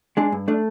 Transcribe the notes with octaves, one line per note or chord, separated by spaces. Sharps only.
G#3 D4
G2
A3 D4